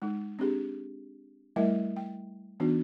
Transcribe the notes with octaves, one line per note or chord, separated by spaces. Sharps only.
G#3 D#4
C4 D4 G4 G#4
G3 A3 E4 A#4 D#5 E5
G5
E3 B3 D4 D#4 F#4